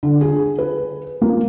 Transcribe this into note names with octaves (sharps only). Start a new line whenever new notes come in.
D3
G#4
B4
A#3